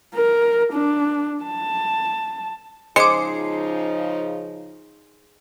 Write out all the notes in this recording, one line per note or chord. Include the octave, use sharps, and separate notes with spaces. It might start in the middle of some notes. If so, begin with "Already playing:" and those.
A#4
D4
A5
C#3 F3 G#3 D#4 G#4 C5 D6 C#7